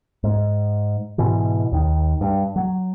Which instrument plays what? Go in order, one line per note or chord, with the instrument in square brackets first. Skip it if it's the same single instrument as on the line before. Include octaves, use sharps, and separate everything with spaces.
[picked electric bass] G#2
G#2 B2 E3
D#2 D#3
G2
F#3